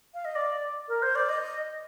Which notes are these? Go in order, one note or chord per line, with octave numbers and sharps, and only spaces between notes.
F5
D#5
D5
A#4
C5
D5
D#5